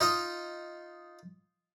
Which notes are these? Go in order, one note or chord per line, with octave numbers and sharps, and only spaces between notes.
D#4 F4 D#5